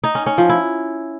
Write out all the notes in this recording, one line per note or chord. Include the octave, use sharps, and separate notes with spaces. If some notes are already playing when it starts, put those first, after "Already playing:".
D#4
C#4
C#4
F3
E4